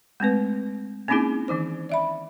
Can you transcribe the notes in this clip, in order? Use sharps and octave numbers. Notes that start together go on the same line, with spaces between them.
G#3 A3 C4 B4
A#3 C4 C#4 D#4 E4 G#4
D#3 E3 D#4 C5
D5 E5 B5